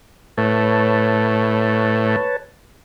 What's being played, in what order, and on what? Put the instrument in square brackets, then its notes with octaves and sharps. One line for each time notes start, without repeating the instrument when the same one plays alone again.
[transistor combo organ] A2 [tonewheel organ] B4 C#5 A5